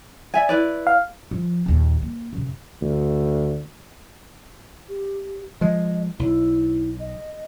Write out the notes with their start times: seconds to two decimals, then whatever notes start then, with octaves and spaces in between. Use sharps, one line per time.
0.34 D5 E5 G#5
0.49 E4 B4 D5
0.87 F5
1.31 F3
1.66 A#1 D#2
2.02 A#3
2.33 F#2 C3
2.81 D2
4.89 G4
5.61 F3 G#3 D#5
6.19 B1 E4
7.00 D#5